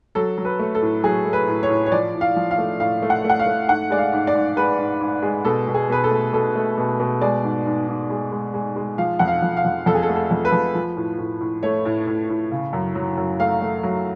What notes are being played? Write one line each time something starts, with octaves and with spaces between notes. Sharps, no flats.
F#3 A4
F#3
B4
A3
A4
A2
F#3 G#4
A3
B4
A2
C#5
A2
C#5
F3 D5
A2
F5
F3
F5
A3
A2 F5
A3
F#5
A3
F#5
F5
A3
G#2 F#5
G#3 D5
F5
G#2
D5
G#2
G#3 B4
G#2
G#2
G#3
B2 A4
B2
G#4
B2 B4
A4
A3
B2 A4
A3
B2
B2
G#3 D5
G#2
G#2
G#2
G#3
G#3
G#3
G#3
F3 F5
F2 F#5
F5
F2
F5
F2
F2 A4
G#4
A4
A3
A4
F2
B4
F2
F3
A2
A2
A2
A3 C#5
A2
A2
A2
C#3
F#2
F#3
F#2
A3 F5
A3
F#3